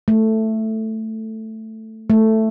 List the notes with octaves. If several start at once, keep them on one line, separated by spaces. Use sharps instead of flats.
A3
A3